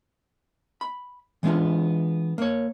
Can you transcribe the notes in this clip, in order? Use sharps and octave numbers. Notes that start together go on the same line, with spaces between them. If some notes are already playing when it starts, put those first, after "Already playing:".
B5
E3 G#3 B3 C4 D4 F4
A#3 C#5